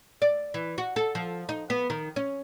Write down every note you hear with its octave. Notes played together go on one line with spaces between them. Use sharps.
D5
E3
F#4
A4
F3
D#4
B3
D#3
C#4